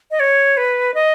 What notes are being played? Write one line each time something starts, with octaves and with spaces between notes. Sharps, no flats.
D#5
C#5
B4
D#5